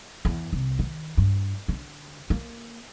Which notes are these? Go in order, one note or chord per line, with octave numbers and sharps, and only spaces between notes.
E2
C2
D#3
G2
D3
A#3